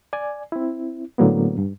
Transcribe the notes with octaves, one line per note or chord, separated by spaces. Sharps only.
D5 G#5
C4 E4
A2 D3 F#3 A#3 B3
G2